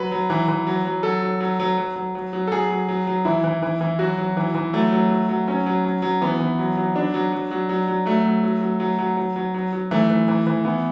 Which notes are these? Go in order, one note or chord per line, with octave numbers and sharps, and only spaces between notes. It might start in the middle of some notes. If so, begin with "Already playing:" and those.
Already playing: F#3 B4
F#3
E3
E3
F#3
F#3
F#3 A4
F#3
F#3
F#3
F#3
F#3
F#3
F#3
A4
F#3 G#4
F#3
F#3
F#3
E3 E4
E3
E3
E3
F#3 F#4
F#3
E3
E3
F#3 A3
F#3
F#3
F#3
F#3 C#4
F#3
F#3
F#3
E3 B3
E3
F#3
F#3
F#3 D4
F#3
F#3
F#3
F#3
F#3
F#3 A3
F#3
F#3
F#3
F#3
F#3
F#3
F#3
F#3
F#3
E3 A3
E3
E3
E3
E3 B3